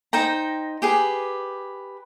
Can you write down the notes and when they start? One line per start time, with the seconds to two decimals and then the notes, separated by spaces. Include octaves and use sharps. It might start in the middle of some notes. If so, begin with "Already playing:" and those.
0.13 D#4 C5 G5 A#5
0.82 G4 G#4 B4